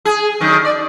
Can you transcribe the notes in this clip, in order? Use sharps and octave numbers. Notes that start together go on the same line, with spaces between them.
G#4
F#2 D3 D#3
D5